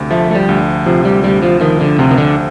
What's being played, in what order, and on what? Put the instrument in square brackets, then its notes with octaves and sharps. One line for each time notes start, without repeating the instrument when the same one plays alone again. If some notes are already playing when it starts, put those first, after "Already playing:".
Already playing: [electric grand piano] D2 C3
[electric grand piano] F3 [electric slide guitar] A3
[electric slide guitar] A3
G3
[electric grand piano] D2
[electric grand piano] C3 [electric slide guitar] F3
[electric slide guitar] G3
[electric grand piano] D2 [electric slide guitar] G3
[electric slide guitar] F3
[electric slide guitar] D#3 [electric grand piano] F3
[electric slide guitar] D3
[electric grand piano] D2 [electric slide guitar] C3
[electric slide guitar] D#3
D3